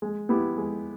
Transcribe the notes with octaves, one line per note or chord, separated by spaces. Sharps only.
G#3
B3 E4 G4
G#3